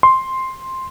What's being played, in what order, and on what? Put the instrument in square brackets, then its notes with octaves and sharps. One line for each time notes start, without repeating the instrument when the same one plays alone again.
[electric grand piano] C6